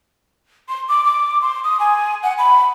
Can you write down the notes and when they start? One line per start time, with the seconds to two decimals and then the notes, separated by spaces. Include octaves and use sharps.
0.69 C6
0.89 D6
1.05 D6
1.42 C6
1.64 D#6
1.80 G#5
2.23 F#5
2.38 B5